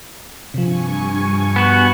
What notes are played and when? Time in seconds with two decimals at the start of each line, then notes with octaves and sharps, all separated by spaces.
0.54 G2 C3 F3 G#5 C#6
1.56 B3 F#4